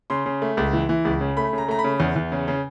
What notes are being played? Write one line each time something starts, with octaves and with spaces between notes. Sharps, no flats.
C#3 C6
C#3
A3
C#2
E3
E3
C#2
C#3
A3 B5
C#3 A#5
A3 A#5
B5
C#3
E2
E2
C#3
C#3